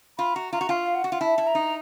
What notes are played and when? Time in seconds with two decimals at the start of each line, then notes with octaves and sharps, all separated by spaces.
0.18 F4 B5
0.35 F#4 A#5
0.52 F4 A#5
0.61 F#4
0.69 F4 F5
0.95 F#5
1.04 F#4
1.12 F4
1.21 E4 A5
1.38 E4
1.47 A#5
1.55 D#4